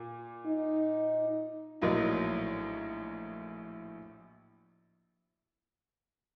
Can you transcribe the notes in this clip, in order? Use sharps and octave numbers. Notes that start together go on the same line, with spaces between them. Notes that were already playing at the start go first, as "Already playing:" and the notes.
Already playing: A#2
D#4
A#1 A2 F#3 A#3 D#4